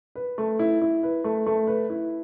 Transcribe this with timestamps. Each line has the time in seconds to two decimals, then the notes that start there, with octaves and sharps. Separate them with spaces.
0.15 B4
0.38 A3
0.59 E4
0.81 E4
1.03 B4
1.24 A3
1.46 A3
1.67 B4
1.90 E4